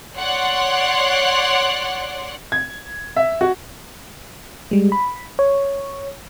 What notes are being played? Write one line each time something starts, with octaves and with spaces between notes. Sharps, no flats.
C#5 D5 F#5 C6 F#6
G#6
E5
F#4
G3 G#3
B5
C#5